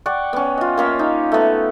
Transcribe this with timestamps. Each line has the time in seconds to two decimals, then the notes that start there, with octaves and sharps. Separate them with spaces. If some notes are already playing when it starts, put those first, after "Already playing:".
0.06 D5 F#5 G5 C#6
0.33 B3 C#4
0.58 F4 D#5
0.77 A#3 C#4 F5
0.99 D#4
1.32 A3 B3